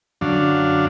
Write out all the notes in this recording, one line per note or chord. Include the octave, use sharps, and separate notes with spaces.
F#2 D3 F#3 D4 F5